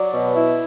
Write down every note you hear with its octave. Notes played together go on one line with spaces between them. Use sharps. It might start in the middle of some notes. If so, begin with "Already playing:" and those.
Already playing: F#3 D5
B2
E4